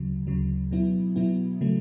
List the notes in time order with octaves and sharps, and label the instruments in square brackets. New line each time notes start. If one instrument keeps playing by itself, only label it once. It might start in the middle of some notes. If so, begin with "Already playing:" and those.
Already playing: [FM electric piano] D2 C#3 F#3
D2 C#3 F#3
B2 F#3 B3 E4
B2 F#3 B3 E4
C#3 F#3 A3